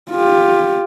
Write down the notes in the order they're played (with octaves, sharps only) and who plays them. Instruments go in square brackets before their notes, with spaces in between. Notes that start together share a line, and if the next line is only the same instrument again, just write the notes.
[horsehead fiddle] F4 G4